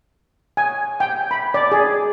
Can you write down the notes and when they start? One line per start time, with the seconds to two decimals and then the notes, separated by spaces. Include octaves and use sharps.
0.57 G#5
1.00 G5
1.31 B5
1.54 D5
1.72 G#4